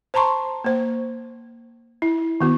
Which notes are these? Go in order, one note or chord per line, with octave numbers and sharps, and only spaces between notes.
C5 A5 A#5 C6 C#6
A#3 C5
E4
D#3 B3 F#4